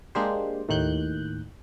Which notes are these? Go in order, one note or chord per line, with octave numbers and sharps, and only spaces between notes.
G#3 A#3 D4 G4 C5
D#2 A2 D#3 F#6 G6